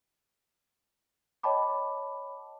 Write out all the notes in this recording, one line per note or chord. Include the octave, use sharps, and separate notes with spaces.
C#5 D#5 G5 A5 B5 D6